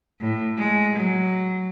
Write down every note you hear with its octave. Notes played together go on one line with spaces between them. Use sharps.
A2
G#3
F#3